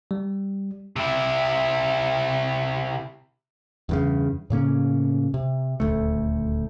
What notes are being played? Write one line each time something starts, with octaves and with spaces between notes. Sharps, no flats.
G3
C3 E4
E2 G2 C#3
A2 C#3 A#3 C#4
C3
D#1 D2 A3